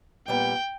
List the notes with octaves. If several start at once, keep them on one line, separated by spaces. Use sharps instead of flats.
A#2 G3 B3 G5